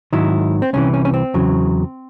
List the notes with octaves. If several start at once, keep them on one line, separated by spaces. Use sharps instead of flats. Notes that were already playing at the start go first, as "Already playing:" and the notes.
G#2 D#3 F#3 E4
C4
C2 C3 E3 C#4
C#4
C#4
C4
E2 C#3 F#3